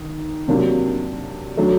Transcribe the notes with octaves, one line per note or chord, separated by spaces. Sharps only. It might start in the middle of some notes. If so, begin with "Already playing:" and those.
Already playing: D#3
C3 F#3 A#3 D4
F#3 A3 D4